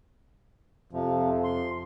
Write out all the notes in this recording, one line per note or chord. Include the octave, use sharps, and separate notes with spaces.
F2 C3 F3
C6